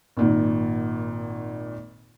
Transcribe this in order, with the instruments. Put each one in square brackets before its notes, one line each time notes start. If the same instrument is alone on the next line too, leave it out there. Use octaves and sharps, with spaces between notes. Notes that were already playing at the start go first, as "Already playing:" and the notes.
[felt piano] G#1 A#2 D#3